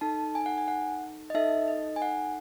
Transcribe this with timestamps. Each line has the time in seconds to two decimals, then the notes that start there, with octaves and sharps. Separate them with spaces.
0.01 D#4 A4 A5
0.35 G#5
0.46 F#5
0.58 G#5
0.68 F#5
1.30 D#5
1.34 D#4 A4 E5
1.68 D#5
1.96 G#5
2.02 F#5